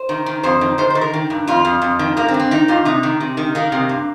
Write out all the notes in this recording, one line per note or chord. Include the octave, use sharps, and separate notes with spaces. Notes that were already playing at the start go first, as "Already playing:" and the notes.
Already playing: C5
D#3
D#3
F2 C5
D#3
D#3 C5
D#3 C5
A#4
D#3
G2
F2 F4
F2
F2
D#3
G2 A#3
C4
G2
C4
D#3 D#4
G2 F4
C3 D#4
D#3
C3
D#3
D#3 A#3
C3
G2